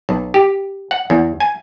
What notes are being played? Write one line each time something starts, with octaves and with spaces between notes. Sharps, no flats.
B1
G4
F#5
E2
G#5